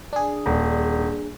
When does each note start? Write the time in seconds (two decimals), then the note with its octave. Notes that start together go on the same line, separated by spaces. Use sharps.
0.13 D4 G#4
0.46 D#1